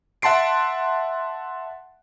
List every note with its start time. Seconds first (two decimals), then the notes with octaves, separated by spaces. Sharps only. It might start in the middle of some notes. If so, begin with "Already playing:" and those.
0.22 E5 F#5 A5 C6 C7 D7